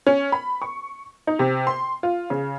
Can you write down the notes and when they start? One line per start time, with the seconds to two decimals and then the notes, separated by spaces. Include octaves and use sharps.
0.07 C#4
0.32 B5
0.62 C#6
1.27 D#4
1.39 C3
1.67 C6
2.03 F4
2.30 C#3